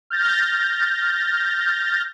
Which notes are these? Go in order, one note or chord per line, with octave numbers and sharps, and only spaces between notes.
F6 G6 A6 A#6